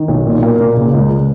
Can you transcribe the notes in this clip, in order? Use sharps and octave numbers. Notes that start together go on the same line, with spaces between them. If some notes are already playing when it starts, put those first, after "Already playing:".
Already playing: D#3
B1
A#2
A#3
A#2
C#3
C#2